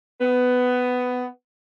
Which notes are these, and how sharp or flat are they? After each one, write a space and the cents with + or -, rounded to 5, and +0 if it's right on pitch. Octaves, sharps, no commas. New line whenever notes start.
B3 +15